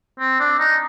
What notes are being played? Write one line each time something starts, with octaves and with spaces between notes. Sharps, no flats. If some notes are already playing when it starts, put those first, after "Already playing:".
C4
D4
D#4